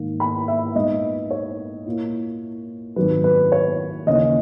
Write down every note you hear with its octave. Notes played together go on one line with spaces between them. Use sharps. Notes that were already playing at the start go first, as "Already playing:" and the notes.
Already playing: G#2 D#3 A#3
B5
E5
A#2 G#3 B3 D#4 D#5
C#5
A#2 A#3 E4
G#1 F#2 D#3 F#3 B4
B4
C#5
D#2 C#3 E3 A#3 C#4 D#5